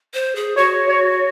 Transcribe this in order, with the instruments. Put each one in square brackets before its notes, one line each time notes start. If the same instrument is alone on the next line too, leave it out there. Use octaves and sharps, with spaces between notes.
[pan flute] C5
G#4
[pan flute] F#4 [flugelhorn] C#5
[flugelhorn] C#5